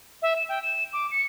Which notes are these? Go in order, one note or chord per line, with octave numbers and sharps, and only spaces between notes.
E5
E7
G5
E7
D6
C#7